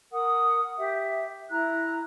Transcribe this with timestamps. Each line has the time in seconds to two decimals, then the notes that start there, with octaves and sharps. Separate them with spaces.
0.11 A#4 F#5 D#6
0.76 G4 E5
1.49 E4 A#5 F#6